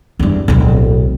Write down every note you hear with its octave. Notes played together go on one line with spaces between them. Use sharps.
E2 G2
D1 B1